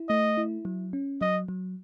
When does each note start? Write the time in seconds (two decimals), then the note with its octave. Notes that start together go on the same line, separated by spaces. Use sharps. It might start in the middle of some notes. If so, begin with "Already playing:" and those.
Already playing: E4
0.09 A3 D#5
0.37 E4
0.65 F#3
0.93 C#4
1.21 F#3 D#5
1.48 F#3